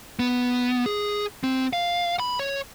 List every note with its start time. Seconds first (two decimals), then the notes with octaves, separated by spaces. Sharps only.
0.19 B3
0.86 G#4
1.44 C4
1.73 F5
2.20 B5
2.40 C#5